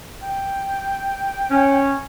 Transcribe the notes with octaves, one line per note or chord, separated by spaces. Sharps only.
G5
C#4